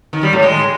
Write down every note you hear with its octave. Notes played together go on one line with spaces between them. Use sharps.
D#3
G3
A2
G#3